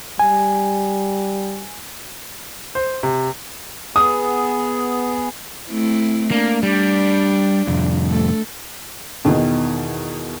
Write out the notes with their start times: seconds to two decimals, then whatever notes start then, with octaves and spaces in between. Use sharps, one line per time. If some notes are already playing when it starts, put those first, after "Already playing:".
0.19 G3 G#5
2.75 C5
3.03 C3
3.96 B3 G#4 D#6
5.70 A3 C4 E4
6.31 A#3 D4
6.63 G3 D4
7.67 C2 F2
8.10 A3 A4
9.25 E2 B2 D#3